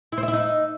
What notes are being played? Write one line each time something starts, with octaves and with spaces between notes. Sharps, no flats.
E4
C5
E5
E4
D#4